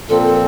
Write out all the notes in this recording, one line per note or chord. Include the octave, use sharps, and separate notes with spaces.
A#2 F3 C4 A4
A4